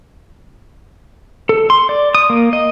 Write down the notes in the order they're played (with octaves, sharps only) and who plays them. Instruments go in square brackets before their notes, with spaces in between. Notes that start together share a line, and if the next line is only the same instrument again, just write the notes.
[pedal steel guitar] A4
C6
D5
D#6
A#3
D#5